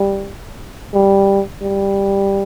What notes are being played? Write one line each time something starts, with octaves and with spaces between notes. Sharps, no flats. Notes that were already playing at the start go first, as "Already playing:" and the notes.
Already playing: G3
G3
G3